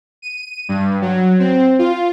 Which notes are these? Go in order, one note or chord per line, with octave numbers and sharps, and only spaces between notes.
D#7
G2
F#3
C4
F4